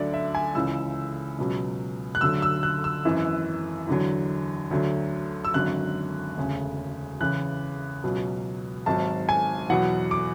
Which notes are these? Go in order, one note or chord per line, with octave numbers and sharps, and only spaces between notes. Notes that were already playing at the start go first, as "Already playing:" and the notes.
Already playing: D2 D3 F#3 D5
E5
G#5
C#2 C#3 E3 E6
C#2 B2 F#3
F#6
D2 D3 F#3 E6
E6
F#6
E6
G#1 F#2 E3
E2 D3 F#3
D2 D3 F#3
E6
G#1 F#2 D3 F#3 F#6
E1 D2 C#3
E2 C#3 E3 F#6
C#2 B2 F#3
G#1 G#2 F#3 A5
G#5
E2 B2 F#3 F#5
D6